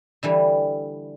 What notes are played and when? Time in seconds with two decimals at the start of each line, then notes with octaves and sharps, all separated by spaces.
0.23 D3 E3 G3